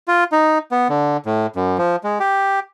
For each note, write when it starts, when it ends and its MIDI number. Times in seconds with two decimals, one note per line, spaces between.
0.08 0.24 65
0.32 0.58 63
0.71 0.88 59
0.89 1.17 50
1.26 1.47 45
1.56 1.78 42
1.78 1.96 53
2.04 2.19 56
2.20 2.60 67